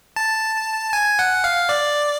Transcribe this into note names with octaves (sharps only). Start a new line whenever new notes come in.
A5
G#5
F#5
F5
D5